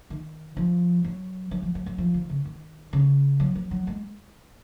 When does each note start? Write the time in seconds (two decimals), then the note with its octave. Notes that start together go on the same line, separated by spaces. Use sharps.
0.10 D#3
0.57 F3
1.04 F#3
1.51 F#3
1.62 F3
1.75 F#3
1.86 F#3
1.98 F3
2.14 D#3
2.30 C#3
2.45 D#3
2.93 C#3
3.40 F#3
3.55 F#3
3.71 F#3
3.87 G#3